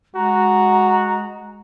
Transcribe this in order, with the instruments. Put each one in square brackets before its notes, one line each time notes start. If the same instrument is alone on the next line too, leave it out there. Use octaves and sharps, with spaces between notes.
[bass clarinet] G#3 [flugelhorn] F#4 [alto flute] A#5